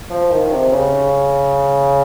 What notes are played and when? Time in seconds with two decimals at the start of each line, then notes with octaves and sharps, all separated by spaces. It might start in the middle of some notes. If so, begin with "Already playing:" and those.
0.10 F3
0.31 D#3
0.51 C3
0.72 C#3